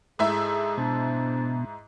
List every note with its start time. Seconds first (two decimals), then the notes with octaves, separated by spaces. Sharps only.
0.19 G#2 E4 G#4 A4 E5
0.77 B2 D4 C5 A5